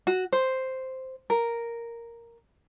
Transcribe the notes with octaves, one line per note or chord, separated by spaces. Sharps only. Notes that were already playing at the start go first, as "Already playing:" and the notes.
F#4
C5
A#4